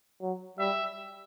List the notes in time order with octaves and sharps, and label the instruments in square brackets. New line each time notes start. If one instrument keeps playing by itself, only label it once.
[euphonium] F#3
[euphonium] G3 [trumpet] E5